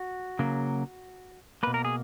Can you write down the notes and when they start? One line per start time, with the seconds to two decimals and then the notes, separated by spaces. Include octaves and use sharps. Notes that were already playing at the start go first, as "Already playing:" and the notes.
Already playing: F#4
0.39 C#3 F#3 A#3
1.63 B2 A#3 B4
1.74 A#4
1.85 G#4